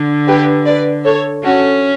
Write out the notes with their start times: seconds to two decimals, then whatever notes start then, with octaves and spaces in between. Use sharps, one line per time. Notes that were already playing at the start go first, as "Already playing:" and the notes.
Already playing: D3
0.27 G4 B4
0.65 B4 D5
1.04 A4 C#5
1.44 C#4 F#4 A4